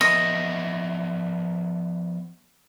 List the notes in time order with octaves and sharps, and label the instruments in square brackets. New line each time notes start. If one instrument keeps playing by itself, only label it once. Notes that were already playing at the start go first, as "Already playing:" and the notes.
[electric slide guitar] F3 B3 E5 [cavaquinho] D#5